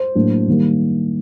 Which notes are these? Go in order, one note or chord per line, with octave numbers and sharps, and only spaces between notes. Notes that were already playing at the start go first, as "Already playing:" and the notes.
Already playing: C5
A2 F#3 A#3 D4
D#3 G3 A#3